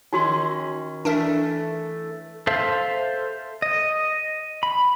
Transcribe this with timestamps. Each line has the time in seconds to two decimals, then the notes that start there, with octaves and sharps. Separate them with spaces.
0.13 D#3 C#4 D#4 F#4 C6
1.05 E3 A3 D4 A#4 E5
2.47 A4 C5 E5 F5
3.62 D#5
4.63 B5